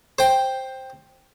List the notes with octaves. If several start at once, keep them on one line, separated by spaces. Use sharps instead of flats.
C5 G5